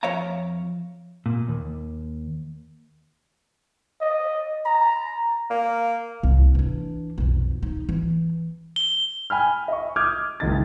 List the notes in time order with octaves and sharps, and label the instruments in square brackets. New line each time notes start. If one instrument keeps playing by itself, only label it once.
[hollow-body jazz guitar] F2 C#5 E5 F5 A#5
[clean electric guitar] A#2
D#2
[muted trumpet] D#5
A#5
[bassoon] A#3
[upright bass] C2
E3 D4
B1 F2
D#4
E3
[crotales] G7
[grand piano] G5 G#5 B5 F6
D#5 E5 C#6
D6 D#6 F6 G6 G#6
F#1 C#2 D#3 D#4 A6